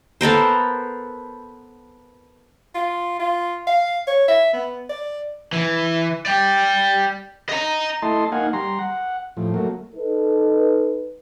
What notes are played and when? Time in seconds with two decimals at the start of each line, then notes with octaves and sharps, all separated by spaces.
0.21 B3 A4 A#4 C5
2.75 F4
3.19 F4
3.67 F5
4.08 C#5
4.28 E5
4.53 B3
4.89 D5
5.53 E3
6.26 D5 G5
7.49 D#5 A#5
8.02 A3 E4 D#5 A5 C6
8.32 A#3 D#4 F5 F#5 G#5
8.53 G3 A#5 C6
8.79 F#5
9.37 A2 F3
9.54 F#3 A3 A#3
9.95 D#4 A4 B4